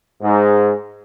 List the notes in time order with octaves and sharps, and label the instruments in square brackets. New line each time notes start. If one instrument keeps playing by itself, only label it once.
[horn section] G#2